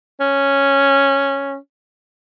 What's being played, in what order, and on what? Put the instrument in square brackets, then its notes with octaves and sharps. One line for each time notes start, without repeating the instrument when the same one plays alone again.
[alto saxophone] C#4